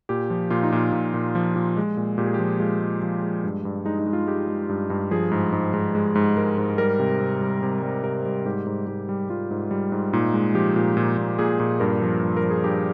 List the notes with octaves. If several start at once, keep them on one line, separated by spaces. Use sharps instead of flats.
A#2 G4
F3
A#2 F4
D#4
A#2 F4
A#2
A#2
F3
A#2
G#3
A#2
A#2 G4
G#4
F3 G4
G#3 F4
G#3
F3
G#3
G2
G2
G#3 D#4
D#4
G#3
F4
G#3 G4
G#3
G2
G2
F3 G#4
G#2
G#2
G#2
G#3
G#2
G#3 A#4
G#2
G3 A#4
C3
C3
G3
C3
G3
C3 A#4
G3
G#2 G4
G#2
G#2 G4
G3
G3 F4
G#2
G3
G#2
A#2 D#4
G#3
F3 G4
A#2
A#2
A#2
A#2 G#4
A#2
G2 A#4
F3
G2
A#4
F3
G#4
G2 G4